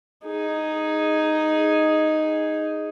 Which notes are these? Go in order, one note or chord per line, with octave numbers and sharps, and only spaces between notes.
D#4 G#4